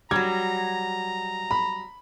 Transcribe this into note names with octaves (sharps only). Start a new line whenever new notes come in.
F#3 G3 A#5 G#6
B5